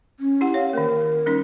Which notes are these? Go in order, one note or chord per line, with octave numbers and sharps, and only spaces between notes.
C#4
E4 G4 F#5
C#5 F5
D#3 A#3 A#4
G3 C#4 D#4